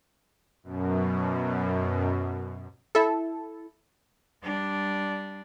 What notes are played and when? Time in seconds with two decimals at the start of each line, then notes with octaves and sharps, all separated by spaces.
0.63 F#2 B2
2.95 E4 A4
4.44 G3 D4